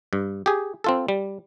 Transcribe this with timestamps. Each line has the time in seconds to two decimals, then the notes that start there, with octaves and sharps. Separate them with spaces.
0.13 G2
0.46 G4 G#4
0.84 C4 F4 A4
1.09 G3